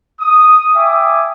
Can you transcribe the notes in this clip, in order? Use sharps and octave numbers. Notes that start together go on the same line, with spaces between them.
D#6
E5 G5 G#5 D6 D#6